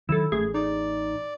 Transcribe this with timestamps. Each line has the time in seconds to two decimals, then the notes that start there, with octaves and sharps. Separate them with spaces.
0.09 D#3 F#3 E4 A4
0.32 A1 A3 G#4
0.54 D#4 D5